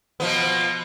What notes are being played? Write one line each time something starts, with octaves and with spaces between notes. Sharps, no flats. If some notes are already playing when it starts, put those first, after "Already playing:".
B2 F3 B3